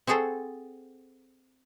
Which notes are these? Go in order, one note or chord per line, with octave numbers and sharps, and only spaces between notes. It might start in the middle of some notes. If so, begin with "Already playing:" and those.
C4 F#4 G#4 A4 C5